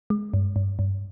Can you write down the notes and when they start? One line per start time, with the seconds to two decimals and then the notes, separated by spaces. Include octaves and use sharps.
0.10 G#3
0.34 G2
0.56 G2
0.79 G2